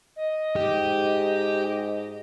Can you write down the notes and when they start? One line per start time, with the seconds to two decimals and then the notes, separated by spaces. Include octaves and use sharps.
0.16 D#5
0.56 G#2 G4